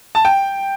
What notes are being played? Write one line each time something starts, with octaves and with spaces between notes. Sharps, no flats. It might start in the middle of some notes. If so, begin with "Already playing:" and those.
A5
G5